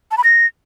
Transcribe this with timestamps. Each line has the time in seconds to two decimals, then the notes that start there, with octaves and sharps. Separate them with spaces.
0.11 A5
0.18 B5
0.24 A#6